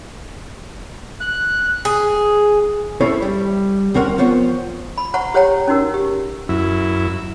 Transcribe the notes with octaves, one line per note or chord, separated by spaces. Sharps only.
F#6
G#4
C#4 E4 A4 C5 C#5
G3
D2 C4 C#4 A#4 F#5
F3 B3 C5 C#5
B5
C5 F#5 A#5 C#6
G4 C5 C#5 F#5 G5 A#5
C#4 D#4 F#4 A#4
G4
F#2 E4